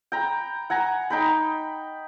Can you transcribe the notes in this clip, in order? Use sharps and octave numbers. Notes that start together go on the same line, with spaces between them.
G5 A#5 B5
F#5 G#5 A#5
D#4 G5 B5